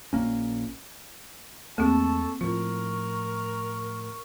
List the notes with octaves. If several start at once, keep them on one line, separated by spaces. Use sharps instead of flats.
A#1 A#3 C#4
E2 A3 A#3 C4 G#4 A4 A5 C#6
A2 F3 F4 A#4 C#6